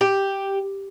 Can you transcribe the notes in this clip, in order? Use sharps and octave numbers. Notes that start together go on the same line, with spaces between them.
G4